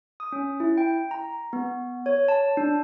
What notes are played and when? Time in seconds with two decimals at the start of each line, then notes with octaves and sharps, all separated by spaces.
0.20 D#6
0.32 C#4
0.60 E4
0.78 G5
1.11 A#5
1.53 B3
2.06 C#5
2.28 A5
2.57 D4